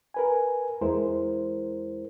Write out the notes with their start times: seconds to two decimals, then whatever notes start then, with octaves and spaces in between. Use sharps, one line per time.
0.14 A#4 B4 G#5
0.81 E2 G#3 E4 A#4 C5